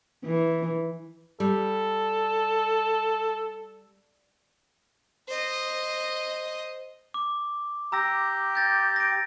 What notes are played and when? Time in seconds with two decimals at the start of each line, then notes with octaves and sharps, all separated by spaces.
0.25 E3
1.40 G3 A4
5.28 C5 D#5
7.14 D6
7.92 G4 A#5 E6 A#6
8.55 G6 A6 A#6
8.96 A#6 D7